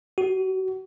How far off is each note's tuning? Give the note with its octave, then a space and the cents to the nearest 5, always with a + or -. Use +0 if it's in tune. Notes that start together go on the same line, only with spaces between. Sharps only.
F#4 +35